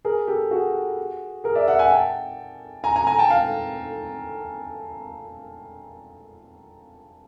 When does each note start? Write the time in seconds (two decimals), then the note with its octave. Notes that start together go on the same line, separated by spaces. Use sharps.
0.05 G#4 A#4
0.27 G4 A4
0.51 F#4 G#4
1.44 G#4 A#4
1.55 D5 E5
1.68 E5 F#5
1.79 F#5 G#5
1.90 G5 A5
2.84 G#5 A#5
2.96 G#5 A#5
3.07 G#5 A#5
3.19 G5 A5
3.30 F5 G5